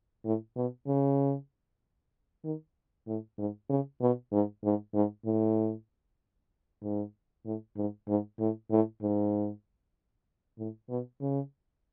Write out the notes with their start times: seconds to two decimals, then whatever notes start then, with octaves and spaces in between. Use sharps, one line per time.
0.25 A2
0.56 B2
0.87 C#3
2.44 D#3
3.07 A2
3.38 G#2
3.70 C#3
4.01 B2
4.32 G#2
4.64 G#2
4.94 G#2
5.26 A2
6.83 G#2
7.45 A2
7.77 G#2
8.08 G#2
8.39 A2
8.71 A2
9.02 G#2
10.59 A2
10.89 B2
11.21 C#3